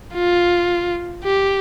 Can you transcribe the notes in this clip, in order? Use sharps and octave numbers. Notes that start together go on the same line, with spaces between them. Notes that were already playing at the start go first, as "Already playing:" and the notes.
F4
G4